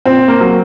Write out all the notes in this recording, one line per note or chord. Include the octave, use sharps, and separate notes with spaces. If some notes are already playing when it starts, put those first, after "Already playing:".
A#2 C4
A#3
F#3